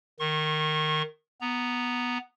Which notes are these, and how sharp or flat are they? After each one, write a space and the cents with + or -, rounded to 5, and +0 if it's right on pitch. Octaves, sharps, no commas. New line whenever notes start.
D#3 -15 C#6 -35
B3 +0 A#5 +0